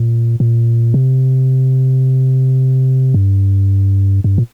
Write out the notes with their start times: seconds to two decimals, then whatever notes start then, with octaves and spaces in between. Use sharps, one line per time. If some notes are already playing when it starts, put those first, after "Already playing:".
Already playing: A#2
0.40 A#2
0.94 C3
3.14 G2
4.24 G2
4.38 A#2